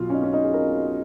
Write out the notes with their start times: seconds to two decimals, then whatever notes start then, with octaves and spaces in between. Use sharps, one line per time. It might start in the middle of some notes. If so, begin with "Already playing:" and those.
Already playing: B1 B2 F4 F#4
0.10 C#4
0.13 D#4
0.23 C#4
0.33 D#4
0.43 G#4
0.54 A#4